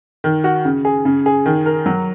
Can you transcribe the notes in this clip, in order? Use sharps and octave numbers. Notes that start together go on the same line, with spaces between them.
D#3
F#4
C#3
G#4
C#3
G#4
D#3
A#4
F#3